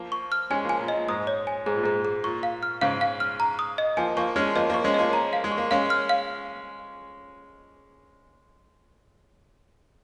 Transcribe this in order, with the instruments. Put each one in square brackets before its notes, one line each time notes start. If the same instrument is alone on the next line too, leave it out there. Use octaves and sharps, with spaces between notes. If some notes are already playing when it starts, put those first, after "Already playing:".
Already playing: [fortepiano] F3 A#3
[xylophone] C#6
F6
[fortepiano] G#3 C#4 [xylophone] G#5
[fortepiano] F3 A#3 [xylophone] G#5
[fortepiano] A#2
[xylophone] D#5
[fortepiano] A#2
[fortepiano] G#2 [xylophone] D#6
[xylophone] C#5
G#5
[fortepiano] G#2 [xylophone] G#4
[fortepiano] A#2
[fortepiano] G#2 [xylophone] G#4
[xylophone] G#4
[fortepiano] A#2 [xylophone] C#6
[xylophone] F5
F6
[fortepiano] G#2 C#3 [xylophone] F5
[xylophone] F5
F6
A#5
D#6
D#5
[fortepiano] F3 A#3 [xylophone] G#5
[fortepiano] F3 A#3 [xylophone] C#6
[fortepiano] G#3 C#4 [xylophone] F6
[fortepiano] F3 A#3 [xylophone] D#5
[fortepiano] F3 A#3 [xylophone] C#6
[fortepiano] G#3 C#4
[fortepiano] F3 A#3 [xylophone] D#5
[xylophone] A#5
F5
[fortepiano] G#3
[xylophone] C#6
[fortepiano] A#3
[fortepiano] G#3 C#4 [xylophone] F5
[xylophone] F6
F5